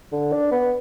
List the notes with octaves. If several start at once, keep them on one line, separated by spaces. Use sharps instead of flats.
D3
D4
B3